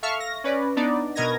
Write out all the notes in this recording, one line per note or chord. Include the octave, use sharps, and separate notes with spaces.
A4 E5 F5 C#6 F6
A#6
C#4 B4 C#5 D5
B3 D4 D#4 D5
B2 B3 A#4 D#5 G#6 A#6